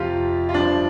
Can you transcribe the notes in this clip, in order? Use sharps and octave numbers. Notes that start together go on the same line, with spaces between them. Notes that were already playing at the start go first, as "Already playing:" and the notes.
Already playing: F2 C3 F3 F4 G4
F4
G2 F3 D4